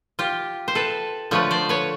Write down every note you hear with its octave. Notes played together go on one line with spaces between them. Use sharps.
F4 G4
C5
A4 B4
D3 F3 A3 B4 C#5
C5 D5
B4 C#5